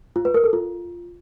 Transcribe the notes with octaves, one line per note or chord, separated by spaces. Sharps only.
F4
B4
A#4
A4
F4